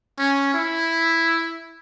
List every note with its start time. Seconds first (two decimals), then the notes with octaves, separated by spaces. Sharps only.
0.18 C#4
0.54 E4